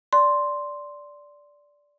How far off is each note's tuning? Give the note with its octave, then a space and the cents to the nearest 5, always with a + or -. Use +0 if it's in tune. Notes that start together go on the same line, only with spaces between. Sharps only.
D5 -10 C6 +0